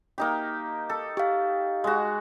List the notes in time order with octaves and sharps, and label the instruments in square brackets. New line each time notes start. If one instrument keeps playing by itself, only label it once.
[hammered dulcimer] A#3 D#4 G4
A4
[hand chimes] G4 F5
[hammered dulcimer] G#3 F#4